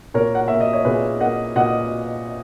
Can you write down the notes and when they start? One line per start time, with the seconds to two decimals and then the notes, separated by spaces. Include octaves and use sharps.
0.14 A#2 A#4 C#5
0.35 F#5
0.48 A#3 E5
0.60 D#5
0.73 C#5
0.85 A#2 G#4 B4
1.20 A#3 D#5 F#5
1.56 A#2 D#5 F#5